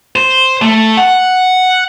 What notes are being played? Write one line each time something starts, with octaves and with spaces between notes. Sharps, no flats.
C5
A3
F#5